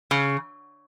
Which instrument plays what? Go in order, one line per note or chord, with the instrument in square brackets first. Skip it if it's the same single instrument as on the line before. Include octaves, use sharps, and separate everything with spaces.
[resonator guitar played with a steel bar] C#3